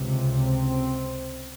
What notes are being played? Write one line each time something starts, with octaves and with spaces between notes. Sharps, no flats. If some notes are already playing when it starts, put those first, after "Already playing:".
Already playing: C#2 C3
C4